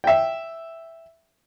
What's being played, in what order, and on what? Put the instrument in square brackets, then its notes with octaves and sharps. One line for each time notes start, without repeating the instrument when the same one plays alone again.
[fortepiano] E5 G5